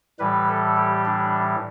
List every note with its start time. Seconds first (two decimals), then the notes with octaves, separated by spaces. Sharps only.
0.19 A2 E3 G3 B4
0.49 A4
0.76 G4
1.05 D4